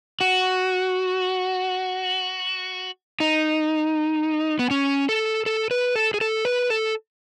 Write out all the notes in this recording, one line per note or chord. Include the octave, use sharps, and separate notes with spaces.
F#4
D#4
B3
C#4
A4
A4
B4
A4
G#4
A4
B4
A4